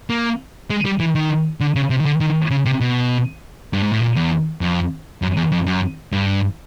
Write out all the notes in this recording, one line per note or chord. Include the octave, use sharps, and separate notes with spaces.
A#3
G#3
G3
E3
D#3
D3
C#3
C3
D#3
D3
D#3
C#3
C3
B2
G2
G#2
A2
A#2
E2
F2
F#2
E2
F2
F#2
G2